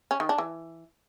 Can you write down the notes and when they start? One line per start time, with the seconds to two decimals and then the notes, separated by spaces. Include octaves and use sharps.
0.11 C#4
0.20 D#3
0.29 D4
0.38 E3